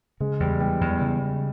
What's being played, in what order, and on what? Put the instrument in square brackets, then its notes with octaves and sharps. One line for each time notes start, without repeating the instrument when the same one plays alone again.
[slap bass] C#3 [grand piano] G#3
[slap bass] E2 [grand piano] G3
[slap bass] E3 [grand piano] G3
[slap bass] E2
C#3